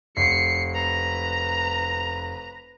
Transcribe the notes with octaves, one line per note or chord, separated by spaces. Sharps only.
F1 C7 C#7
B4 A#5